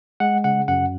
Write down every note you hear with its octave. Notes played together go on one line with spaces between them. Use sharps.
G#3 F#5
C#3 F#5
F#2 F#5